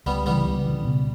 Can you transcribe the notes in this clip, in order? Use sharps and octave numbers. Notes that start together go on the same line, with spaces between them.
C#2 G3 B3
C#3 E3 G3 B3
C#2
C#3 E3
B2